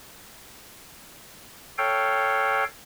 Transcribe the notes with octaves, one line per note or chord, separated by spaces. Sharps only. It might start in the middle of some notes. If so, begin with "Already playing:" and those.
A4 C#5 F5 G5